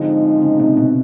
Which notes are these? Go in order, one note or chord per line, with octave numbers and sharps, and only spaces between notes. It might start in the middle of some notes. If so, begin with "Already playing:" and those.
Already playing: G#2 D3 F3 G#3 C4 D#4
C#3
C3
B2